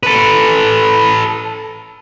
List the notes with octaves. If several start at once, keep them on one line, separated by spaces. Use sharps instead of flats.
A4 B4